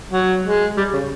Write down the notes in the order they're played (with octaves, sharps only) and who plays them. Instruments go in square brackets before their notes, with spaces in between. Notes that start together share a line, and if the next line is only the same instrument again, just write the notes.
[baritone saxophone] F#3
G#3
G3
C#3